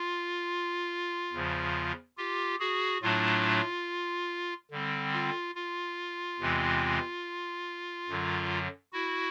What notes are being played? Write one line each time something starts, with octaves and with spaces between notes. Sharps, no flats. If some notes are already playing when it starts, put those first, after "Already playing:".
Already playing: F4
E2 C#3 F3
F4 G4
F#4 G#4
A2 F#3 A3 D4 F4
D3 G3 C4
F4
F4
E2 C3 E3 G#3 C4
F#2 D3 F#3
E4 F#4